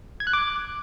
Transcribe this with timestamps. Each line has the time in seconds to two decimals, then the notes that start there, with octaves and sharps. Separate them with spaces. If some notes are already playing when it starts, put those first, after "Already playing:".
0.20 G#6
0.27 F#6
0.33 D6